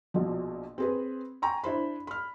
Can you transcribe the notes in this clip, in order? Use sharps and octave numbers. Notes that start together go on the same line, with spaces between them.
A#1 B2 F3
C4 G#4 B4
G5 G#5 A#5 C#6
D4 E4 C5 B5
B5 F6